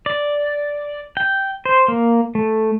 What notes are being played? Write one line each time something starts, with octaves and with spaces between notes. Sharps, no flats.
D5
G5
C5
A#3
A3